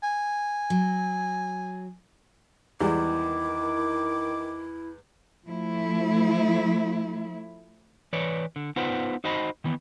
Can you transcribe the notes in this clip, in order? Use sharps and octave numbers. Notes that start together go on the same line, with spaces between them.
G#5
F#3
E2 D#3 G3 G#3 E4 D6
F3 A3 E4
E3 B4 C#5 D5
D3
B3 D#4 F4 B4 C5 F#5
D#4 F#4 C5 D#5 B5
D#3 E3 B3